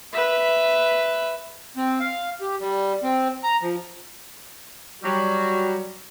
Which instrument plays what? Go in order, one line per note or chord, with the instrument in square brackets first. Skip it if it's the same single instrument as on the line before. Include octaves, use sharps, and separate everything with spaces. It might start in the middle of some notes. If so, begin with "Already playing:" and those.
[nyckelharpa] B4 E5
[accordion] C4
F5
G4
G3
C4
A#5
F3
[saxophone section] F#3 G3 [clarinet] F#4